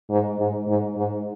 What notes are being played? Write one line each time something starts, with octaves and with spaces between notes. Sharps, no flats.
G#2
G#2
G#2
G#2